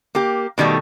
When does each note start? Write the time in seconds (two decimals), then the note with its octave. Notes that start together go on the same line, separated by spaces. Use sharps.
0.15 A#3 G4
0.58 B2 D#3 G3 A3